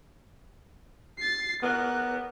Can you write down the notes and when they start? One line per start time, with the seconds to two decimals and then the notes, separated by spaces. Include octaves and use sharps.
1.18 A6 C7
1.63 B3 A#4 F#6